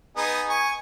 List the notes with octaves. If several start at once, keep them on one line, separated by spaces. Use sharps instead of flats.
B3 D#4 G#4
G#5 C#6